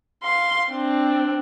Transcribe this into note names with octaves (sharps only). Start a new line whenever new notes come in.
F5 C6
C4 D4